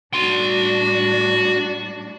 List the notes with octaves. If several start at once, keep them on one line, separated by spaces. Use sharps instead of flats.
A2 G3 D4 F#4 C6